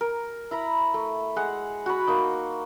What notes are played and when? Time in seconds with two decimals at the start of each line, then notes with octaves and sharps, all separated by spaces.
0.01 A#4
0.51 E4 A#5 B5
0.94 A3
1.36 G#3 F#5
1.86 F#4 B5
2.07 A#3 D#4